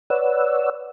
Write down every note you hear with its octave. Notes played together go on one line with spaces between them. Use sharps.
B4 C#5 D5 F#5 E6